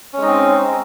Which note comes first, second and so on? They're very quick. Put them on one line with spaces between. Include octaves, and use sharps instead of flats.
C#4 G#3 D#4 C4